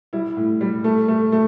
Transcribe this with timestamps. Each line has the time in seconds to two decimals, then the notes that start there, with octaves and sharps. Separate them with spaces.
0.13 G3 E4
0.37 A2
0.61 G3
0.84 A3
1.08 A3
1.32 A3